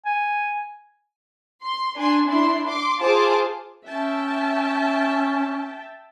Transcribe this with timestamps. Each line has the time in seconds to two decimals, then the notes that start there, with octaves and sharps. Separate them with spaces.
0.06 G#5
1.63 C6
1.96 D4 G#5 C6
2.26 D4 E4 C6
2.66 C6 D6
2.99 F4 G#4 C5 A5 D6
3.86 C#4 E5 G5 A5